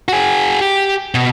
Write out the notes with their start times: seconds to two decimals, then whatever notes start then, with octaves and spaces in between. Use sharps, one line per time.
0.08 F#4 G#4
0.61 G4
1.15 B2